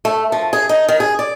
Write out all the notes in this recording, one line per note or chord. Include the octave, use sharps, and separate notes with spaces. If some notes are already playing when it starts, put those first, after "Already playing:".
A3
F3
G#4
D#4
D#3
G#4
D5